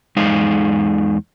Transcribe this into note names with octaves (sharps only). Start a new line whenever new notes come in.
E2 G#3 D#4 F5